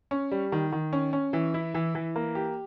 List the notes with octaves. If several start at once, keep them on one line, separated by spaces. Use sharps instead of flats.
C#4
G3
D#3
D#3
C#4
C#4
E3
E4
E3
E3
A#3
G4